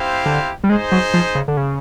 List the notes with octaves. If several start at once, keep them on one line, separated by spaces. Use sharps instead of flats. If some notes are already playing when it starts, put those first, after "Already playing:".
Already playing: C4 E4 G4 C5 F5
D3
G3
G#3 D#4 G#4 C5
F#3
F3
C#3
D3
C#3